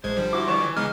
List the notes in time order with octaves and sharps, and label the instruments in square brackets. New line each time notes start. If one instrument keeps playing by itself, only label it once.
[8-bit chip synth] A1 G#3 G#6 [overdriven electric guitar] C5
[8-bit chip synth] D3 F3 G3
[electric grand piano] E4 F#4 C6 [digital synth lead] D6
[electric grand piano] E3 C#6 E7 [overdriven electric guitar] C#5 D5
[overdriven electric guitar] D#3 G#5
[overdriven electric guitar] C#2 [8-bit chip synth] G#3 B3 D#4 [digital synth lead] F6